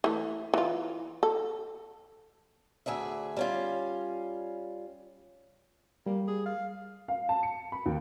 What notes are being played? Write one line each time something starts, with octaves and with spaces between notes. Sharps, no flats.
E3 A3
E3 F4
A4
D2 G#4 D5 E5
G3 C#4 F4
G3 A#3
G#4
F5
F5
A5
C#7
B5
D#2